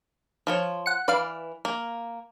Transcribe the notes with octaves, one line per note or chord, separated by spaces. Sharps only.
F3 F4 C#5
F#5 C#7
E3 B4 D5 F5
A#3